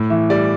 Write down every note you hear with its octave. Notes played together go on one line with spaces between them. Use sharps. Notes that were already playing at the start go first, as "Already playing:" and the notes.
Already playing: A2
E3 E5
G3 D5